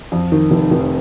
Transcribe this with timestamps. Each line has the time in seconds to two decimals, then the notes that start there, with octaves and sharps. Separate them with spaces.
0.12 F2
0.32 D#3
0.51 F1
0.71 F1